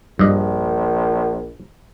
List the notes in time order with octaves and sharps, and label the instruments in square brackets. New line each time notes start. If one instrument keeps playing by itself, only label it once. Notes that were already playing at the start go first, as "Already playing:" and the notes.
[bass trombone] A#1 [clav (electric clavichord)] G2 D#5